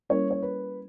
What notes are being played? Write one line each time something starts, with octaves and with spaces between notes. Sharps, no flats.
G3 A#3 C#4 E4 A#4 C#5
C#5
B4